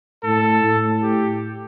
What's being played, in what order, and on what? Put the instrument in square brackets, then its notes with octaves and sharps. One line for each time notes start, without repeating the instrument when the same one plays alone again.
[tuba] A2 [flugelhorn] A4
[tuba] A2
[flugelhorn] G4